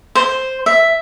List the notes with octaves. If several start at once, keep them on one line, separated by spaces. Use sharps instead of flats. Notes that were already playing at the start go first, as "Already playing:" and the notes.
C5
E5